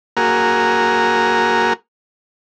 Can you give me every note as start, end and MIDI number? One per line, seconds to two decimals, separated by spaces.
0.17 1.73 58
0.17 1.73 66
0.17 1.73 68
0.17 1.73 70